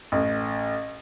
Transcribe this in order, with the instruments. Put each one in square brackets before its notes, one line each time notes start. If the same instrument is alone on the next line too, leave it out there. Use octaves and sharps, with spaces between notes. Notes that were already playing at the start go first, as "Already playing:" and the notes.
[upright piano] A1